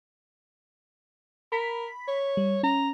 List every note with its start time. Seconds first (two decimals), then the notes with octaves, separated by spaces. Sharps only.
1.52 A#4 B5 B6
2.08 C#5
2.37 G3
2.63 C#4 A#5